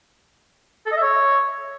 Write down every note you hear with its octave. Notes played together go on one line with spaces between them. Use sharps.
A4
D#5
E5
C#5